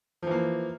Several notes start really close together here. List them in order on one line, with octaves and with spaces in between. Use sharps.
F3 E3 A#3